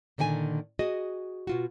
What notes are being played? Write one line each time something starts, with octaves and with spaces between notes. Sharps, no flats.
A#2 D3 D#3 G5 G#5
F#4 G#4 D#5
B2 F4 F#4